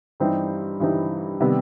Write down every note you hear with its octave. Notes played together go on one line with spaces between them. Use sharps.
G2 E3 G3 C4 D#4
G2 E3 G3 C4 D#4
C3 D#3 G3 B3